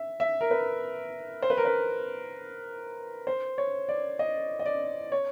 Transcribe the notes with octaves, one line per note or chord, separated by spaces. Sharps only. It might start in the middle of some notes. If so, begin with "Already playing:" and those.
Already playing: E5
E5
A#4
B4
C5
B4
A#4
B4
C5
C#5
D5
D#5
D#5
D5
C#5